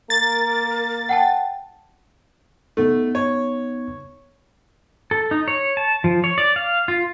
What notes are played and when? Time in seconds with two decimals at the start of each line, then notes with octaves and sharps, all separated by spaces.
0.10 A#3 A#4 A6
1.09 F#5 G5 A5
2.77 C#3 A3 B3 D#4
3.15 C#5
5.11 A4
5.31 D#4
5.48 C#5
5.77 A5
6.04 F3
6.24 C#5
6.38 D5
6.56 F5
6.88 F4